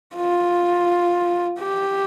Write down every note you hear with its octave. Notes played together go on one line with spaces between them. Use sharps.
F4
G4